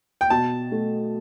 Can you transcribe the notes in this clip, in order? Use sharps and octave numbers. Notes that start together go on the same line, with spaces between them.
G5
B2 A5
A3